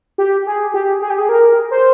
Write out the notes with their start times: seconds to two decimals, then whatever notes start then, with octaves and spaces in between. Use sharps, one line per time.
0.18 G4
0.47 G#4
0.74 G4
1.02 G#4
1.10 G4
1.18 G#4
1.29 A#4
1.71 C5